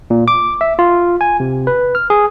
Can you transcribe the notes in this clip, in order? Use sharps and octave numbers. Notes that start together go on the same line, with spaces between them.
A#2
D6
E5
F4
G#5
C3
B4
F6
G#4